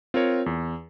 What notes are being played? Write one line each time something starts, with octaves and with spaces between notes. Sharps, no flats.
C4 F4 A#4 C#5
E2